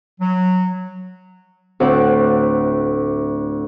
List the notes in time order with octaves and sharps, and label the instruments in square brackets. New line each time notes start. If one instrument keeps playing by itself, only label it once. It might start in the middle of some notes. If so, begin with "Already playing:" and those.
[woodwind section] F#3
[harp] D2 A2 C4 F#5 D6